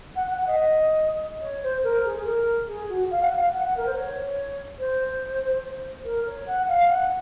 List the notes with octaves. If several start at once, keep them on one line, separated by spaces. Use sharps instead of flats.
F#5
F#5
F#5
D#5
C#5
C5
A#4
G#4
G#4
A#4
G#4
F#4
F5
F#5
F5
F#5
F#5
A#4
C5
C#5
C5
A#4
C#5
F#5
F5
F#5